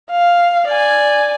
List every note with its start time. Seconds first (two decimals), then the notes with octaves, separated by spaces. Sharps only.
0.11 F5
0.67 D5 G#5